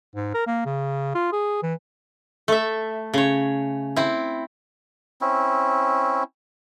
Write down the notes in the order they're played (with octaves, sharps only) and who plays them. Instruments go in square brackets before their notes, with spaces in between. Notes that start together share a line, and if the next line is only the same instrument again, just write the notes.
[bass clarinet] G#2
A#4
A#3
C#3
F4
G#4
E3
[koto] A3 E5
C#3 C#5
C4 E4
[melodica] C4 C#4 E4